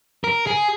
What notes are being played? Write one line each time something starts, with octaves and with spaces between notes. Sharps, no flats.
A#4
G#4